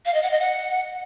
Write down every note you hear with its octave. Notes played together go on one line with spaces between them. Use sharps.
F5
D#5
F#5
D#5
F#5